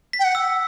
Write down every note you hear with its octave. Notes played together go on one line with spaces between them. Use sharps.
B6
G5
F#5
E6